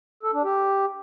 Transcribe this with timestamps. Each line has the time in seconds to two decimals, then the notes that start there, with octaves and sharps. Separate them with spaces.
0.23 A4
0.33 D4
0.43 G4